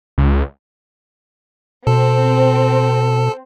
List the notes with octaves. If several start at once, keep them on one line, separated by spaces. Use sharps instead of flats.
C#2
B2 C4 A4